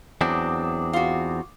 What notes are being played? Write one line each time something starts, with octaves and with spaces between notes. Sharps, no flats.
E2 F#3 C4 D4 D6 D#6
F4 F#4